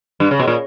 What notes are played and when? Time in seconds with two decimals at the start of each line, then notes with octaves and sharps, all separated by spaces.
0.20 G2
0.31 C#3
0.40 B2
0.48 A#2